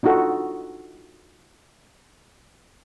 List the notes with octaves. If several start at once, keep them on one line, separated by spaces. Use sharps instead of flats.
D4 D#4 F4 F#4 A4